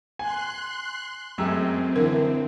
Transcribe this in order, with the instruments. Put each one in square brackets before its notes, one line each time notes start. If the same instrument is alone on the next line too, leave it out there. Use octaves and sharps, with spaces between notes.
[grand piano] G#5 [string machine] C6 F#6
[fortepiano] F#2 G#3 A3 [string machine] C4 [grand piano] G5 A#5 E6
[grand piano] D3 E3 [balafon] A#4